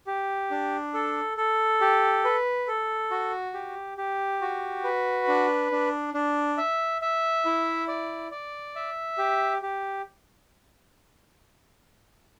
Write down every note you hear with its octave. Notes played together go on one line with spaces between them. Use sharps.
G4
D4
A4
A4
G4
B4
A4
F#4
G4
G4
F#4
B4
D4
D4
D4
E5
E5
E4
D5
D5
E5
G4
G4